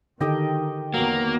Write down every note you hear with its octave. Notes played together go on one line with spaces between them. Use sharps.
D3 D#3 D#4 G4 A4 D#5 G5
E2 D#3 F#3 A#3 B3